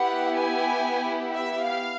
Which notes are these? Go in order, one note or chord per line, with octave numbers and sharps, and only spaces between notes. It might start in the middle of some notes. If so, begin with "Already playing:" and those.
Already playing: B3 E4 G4 F#5
G#5
E5
F5